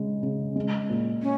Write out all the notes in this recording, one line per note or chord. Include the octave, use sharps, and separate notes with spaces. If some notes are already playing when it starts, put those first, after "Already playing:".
Already playing: C#3 G#3
C#3
G#3
A#2
C#4